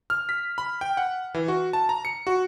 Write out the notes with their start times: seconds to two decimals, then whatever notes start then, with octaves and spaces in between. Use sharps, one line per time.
0.10 F6
0.29 B6
0.58 B5
0.81 G5
0.97 F#5
1.34 E3
1.48 F#4
1.73 A5
1.89 A#5
2.05 C#7
2.27 F#4